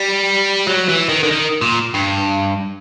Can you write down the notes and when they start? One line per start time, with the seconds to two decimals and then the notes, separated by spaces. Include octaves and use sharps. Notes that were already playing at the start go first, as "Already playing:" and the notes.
Already playing: G3
0.67 F#3
0.89 E3
1.09 D#3
1.23 D3
1.31 D#3
1.61 A#2
1.94 G2